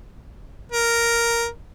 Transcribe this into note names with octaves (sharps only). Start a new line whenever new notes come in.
A#4